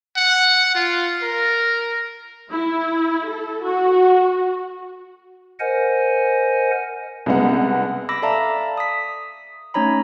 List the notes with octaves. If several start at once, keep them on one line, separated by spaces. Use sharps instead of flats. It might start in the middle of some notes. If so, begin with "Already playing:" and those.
F#5
F4
A#4
E4
A4
F#4
A#4 C5 D#5 F#5 G#5
C2 C#3 G#3 B3 F#5
B5 D6 E6 A#6
A4 D5 E5 F5 A5 A#5
D#6 B6
A3 C#4 D#4 C#5 A#5 B5